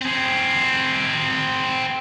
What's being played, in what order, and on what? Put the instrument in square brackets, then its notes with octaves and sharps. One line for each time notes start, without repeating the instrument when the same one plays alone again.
[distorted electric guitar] C4 G#4